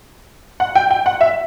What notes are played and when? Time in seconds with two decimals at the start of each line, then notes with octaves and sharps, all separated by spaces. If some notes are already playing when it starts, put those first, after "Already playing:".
0.60 F#5
0.75 G5
0.91 G5
1.06 F#5
1.21 E5